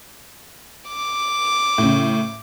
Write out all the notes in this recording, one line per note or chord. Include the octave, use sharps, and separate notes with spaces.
D6
A2 C#3